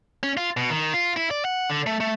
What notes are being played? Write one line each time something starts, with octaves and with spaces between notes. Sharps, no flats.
C#4
F4
B2
D#3
F4
E4
D5
F#5
D3
A3
A3